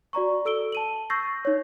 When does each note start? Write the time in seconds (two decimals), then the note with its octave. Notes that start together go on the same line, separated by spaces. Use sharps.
0.13 F#4 D5 A#5 C#6
0.45 A4 E6 D7 G7
0.72 A5 D#7 F#7
1.10 C#6 E6 G6 A6 A#6 C7
1.45 D#4 C#5